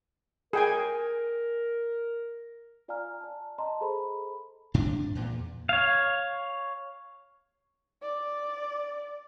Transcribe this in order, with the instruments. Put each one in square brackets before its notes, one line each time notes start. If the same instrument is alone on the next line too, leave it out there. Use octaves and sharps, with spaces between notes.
[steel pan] G#4 G5 G#5 [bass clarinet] A#4
[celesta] F4 D5 F5 G#5 A#5 F6
D5 A5
D#5 A5 A#5 C6
G#4 A4 C5 B5
[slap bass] G#2 C3 D4
E2 A#2
[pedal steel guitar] C#5 F5
[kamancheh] D5